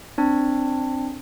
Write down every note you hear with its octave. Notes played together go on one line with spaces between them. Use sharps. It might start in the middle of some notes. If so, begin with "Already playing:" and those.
C4 D4